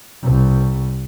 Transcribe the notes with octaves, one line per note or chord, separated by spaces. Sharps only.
C2